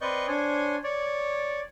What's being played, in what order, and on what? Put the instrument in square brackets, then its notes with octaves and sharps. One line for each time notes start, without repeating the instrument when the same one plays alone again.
[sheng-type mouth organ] C4 B4 D5 D#5 C#6 G6
D4 C5 C#5 G#5
C#5 D5